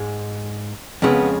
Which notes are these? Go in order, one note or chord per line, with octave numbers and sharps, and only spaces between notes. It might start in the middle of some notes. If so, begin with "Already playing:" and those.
Already playing: G#2 G#3
F2 C#3 G#3 B3